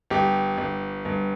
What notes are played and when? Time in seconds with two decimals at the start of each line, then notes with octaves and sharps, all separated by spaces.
0.10 G1 G4
0.58 G1
1.05 G1